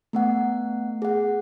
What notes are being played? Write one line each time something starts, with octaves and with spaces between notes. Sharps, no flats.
A3 B3 F#5
G#4 F#5